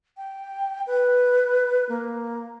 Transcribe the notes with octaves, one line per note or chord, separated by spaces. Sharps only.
G5
B4
A#3